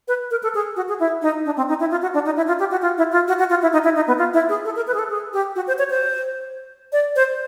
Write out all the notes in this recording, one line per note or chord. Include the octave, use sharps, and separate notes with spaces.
B4
A#4
A4
G#4
F#4
G#4
E4
D#4
D4
C4
D#4
E4
F4
F#4
D4
D#4
E4
F4
G4
F#4
F4
E4
F4
F#4
F#4
F4
E4
D#4
E4
D#4
B3
F4
E4
G#4
A4
A#4
B4
G#4
A4
G#4
G4
F#4
C5
C#5
C5
D5
C5